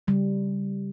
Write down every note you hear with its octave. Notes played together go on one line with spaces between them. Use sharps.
C#3 G3